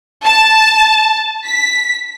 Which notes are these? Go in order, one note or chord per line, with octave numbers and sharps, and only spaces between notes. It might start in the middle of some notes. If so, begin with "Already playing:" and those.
A5
B6